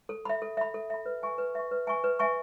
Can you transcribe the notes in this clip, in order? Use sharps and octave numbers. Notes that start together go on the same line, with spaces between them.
A4
E5 B5
A4
E5 B5
A4
E5 B5
B4
E5 G#5 C#6
B4
E5 G#5 C#6
B4
E5 G#5 C#6
B4
E5 G#5 C#6